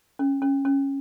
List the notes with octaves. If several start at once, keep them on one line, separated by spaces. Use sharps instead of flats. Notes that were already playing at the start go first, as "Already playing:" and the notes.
C#4
C#4
C#4